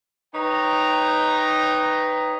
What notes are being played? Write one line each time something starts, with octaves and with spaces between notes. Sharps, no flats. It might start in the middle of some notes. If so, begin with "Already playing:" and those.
D#4 B4 C#5 D#5 G5 A#5